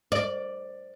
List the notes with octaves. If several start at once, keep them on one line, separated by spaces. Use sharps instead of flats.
D5